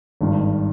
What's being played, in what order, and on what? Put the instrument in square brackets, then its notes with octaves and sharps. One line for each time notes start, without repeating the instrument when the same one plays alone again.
[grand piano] G#1 G2 D#3